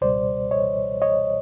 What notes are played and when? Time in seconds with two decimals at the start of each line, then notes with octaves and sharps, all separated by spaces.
0.01 C#2 B2 G3 C5 D5
0.51 C#5 D#5
1.02 C#5 D#5